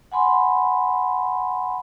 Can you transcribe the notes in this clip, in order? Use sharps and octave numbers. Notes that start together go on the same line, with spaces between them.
F#5 G#5 B5 C6